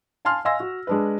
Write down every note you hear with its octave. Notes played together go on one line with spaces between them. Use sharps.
F5 G#5 A5 C6 F6
D#5 F5 G#5 C6 E6 A#6
F#4
G#3 D4 B4